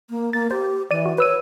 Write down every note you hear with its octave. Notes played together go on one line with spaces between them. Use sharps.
A#3
A#3 A6
G4 C5
E3 D5 D#7
F#4
B4 C#5 E6 D#7